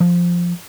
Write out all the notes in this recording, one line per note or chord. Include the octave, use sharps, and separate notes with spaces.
F3